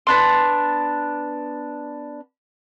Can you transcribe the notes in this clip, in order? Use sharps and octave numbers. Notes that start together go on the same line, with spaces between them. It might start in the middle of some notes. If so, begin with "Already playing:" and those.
B3 D4 C6